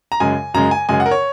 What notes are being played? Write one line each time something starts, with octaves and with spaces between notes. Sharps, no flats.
A#5
F#2 C#3 G#3 G#5
F#2 C#3 G#3 A#5
G#5
F#2 C#3 G#3 G#5
F#5
A#4
C#5